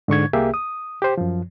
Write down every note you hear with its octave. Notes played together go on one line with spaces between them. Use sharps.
G#2 D3 C#6 G#6
C2 A#3 G4 G#4 E5
D#6
G4 C5
F#2 F3